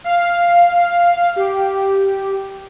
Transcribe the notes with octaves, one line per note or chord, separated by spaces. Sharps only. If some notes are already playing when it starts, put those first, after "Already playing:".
F5
G4